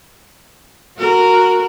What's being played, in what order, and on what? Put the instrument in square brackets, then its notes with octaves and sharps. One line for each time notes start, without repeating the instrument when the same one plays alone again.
[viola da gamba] F#4 A#4